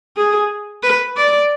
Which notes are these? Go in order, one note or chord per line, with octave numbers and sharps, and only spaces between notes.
G#4
B4
D5